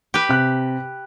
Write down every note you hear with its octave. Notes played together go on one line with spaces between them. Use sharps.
G4 B4
C3 F#6